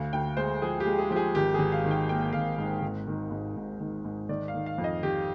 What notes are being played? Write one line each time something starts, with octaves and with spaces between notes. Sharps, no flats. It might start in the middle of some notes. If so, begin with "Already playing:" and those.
Already playing: D2 F5
D2 G5
G#3 C5
F3 G#4
G4
G#3
G#4
F3 G4
G#4
G#1 G4
G#1 G#4
F5
D#3
G5
A#3 G5
G#1 F5
G#2
G#1
D#3
G#2
G#2
D#3
G#2
D#3 D5
F5
D#3
F5
F2
D#5
D#3 G4